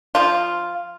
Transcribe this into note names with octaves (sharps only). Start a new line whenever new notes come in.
F3 F4